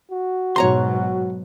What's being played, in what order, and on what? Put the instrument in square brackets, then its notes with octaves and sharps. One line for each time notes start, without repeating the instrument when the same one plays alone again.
[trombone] F#4
[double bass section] G#2 B2 F#3 [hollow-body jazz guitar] C#5 A#5 C6